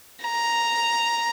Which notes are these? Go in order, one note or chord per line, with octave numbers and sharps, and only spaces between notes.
A#5